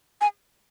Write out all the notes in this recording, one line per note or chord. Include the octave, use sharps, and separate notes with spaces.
G#5